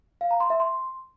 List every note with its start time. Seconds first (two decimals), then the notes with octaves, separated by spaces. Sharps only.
0.21 F5
0.31 A#5
0.40 C6
0.50 E5
0.60 C6